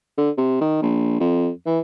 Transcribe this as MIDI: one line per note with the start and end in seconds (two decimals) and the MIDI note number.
0.18 0.30 50
0.38 0.56 48
0.61 0.82 51
0.82 1.19 34
1.20 1.50 41
1.66 1.80 52